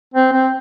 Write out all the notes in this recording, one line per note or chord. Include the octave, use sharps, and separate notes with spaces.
C4
C4